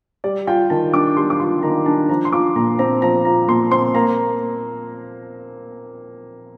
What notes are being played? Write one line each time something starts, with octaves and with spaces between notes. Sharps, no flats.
G3 D5
F4 G5
D#3 A5
D4 D6
G3 C6
D6
F4 C6
D#3 A#5
D4 A5
F3 A#5
C6
F4 D6
A#2 A#5
C4 A#5
F3 A#5
F4 A#5
A#2 C6
C4 C6
A#3 A#5